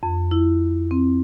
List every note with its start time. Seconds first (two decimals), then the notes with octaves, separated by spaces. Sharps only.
0.03 F2
0.31 E4
0.91 C4